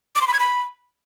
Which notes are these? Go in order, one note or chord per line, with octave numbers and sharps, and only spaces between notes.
D6
C6
B5
G#6
B5